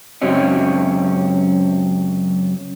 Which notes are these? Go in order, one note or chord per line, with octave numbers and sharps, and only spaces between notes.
C#2 F#2 F#3 C4 C#4 D#5